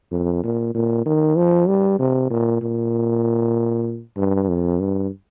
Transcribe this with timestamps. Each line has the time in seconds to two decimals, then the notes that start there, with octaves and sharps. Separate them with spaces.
0.12 F2
0.44 A#2
0.75 A#2
1.06 D#3
1.37 F3
1.68 G3
1.99 C3
2.31 A#2
2.62 A#2
4.17 G2
4.49 F2
4.80 G2